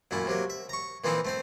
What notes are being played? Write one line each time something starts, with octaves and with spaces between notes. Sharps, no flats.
F#2 A#2 A3 E4
C3 F#3 A#3
E5
A#5 C#6
A#2 E3 F3 C4 D#4 E4
A3 C4 C5